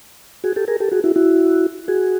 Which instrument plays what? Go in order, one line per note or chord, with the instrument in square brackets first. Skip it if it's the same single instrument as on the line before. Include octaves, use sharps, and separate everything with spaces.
[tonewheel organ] F#4 G#4
G4 A4
G#4 A#4
G4 A4
F#4 G#4
E4 F#4
E4 F#4
F#4 G#4